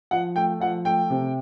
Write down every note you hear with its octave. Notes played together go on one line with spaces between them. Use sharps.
F3 F#5
A3 G5
F3 F#5
A3 G5
C3